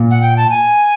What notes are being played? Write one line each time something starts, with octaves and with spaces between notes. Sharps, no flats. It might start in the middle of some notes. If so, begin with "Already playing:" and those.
Already playing: A#2
F#5
G5
A5
G#5